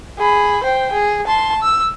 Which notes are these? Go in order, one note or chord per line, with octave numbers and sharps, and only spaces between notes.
G#4 B5
C5 G5
G#4
A5 C6
E6